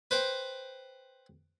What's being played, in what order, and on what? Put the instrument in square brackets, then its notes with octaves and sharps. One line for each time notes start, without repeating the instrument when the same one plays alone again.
[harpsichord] B4 C5 G5